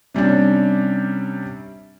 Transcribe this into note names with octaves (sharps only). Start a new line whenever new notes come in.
C3 G3 C#4 D4